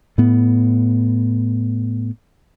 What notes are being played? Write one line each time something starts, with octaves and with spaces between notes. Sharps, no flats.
A2 B3